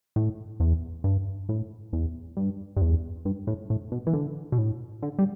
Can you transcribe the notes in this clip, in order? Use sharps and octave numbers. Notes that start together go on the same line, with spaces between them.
A2
E2
G2
A2
E2
G2
G2
E2
G2
A2
A2
B2
E3
D3
B2
A2
D3
G3